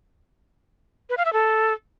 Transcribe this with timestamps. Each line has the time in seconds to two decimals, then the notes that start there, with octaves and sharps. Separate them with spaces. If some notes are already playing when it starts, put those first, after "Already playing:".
1.10 B4
1.17 F5
1.25 E5
1.33 A4